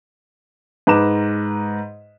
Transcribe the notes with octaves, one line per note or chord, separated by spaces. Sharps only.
G#2 B4 A#5 D6 E7